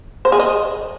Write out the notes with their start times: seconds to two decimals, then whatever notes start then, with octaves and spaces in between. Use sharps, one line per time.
0.25 C5
0.32 G#4
0.40 D#5